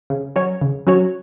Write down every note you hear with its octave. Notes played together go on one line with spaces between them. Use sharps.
C#3
F#3 C#4 F#4 C#5
C#3
F#3 C#4 F#4 C#5